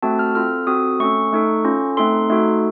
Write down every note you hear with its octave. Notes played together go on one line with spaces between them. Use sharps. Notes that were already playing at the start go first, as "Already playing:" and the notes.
A3 C4 F#4 A4 A5
F6
C4 F4 A4 F6
C4 F#4 A4 D#6
A3 C#4 A4 C#6
A3 D#4 A4
C#4 F4 A4
A3 C4 D#4 A4 C6
A3 D#4 F#4 A4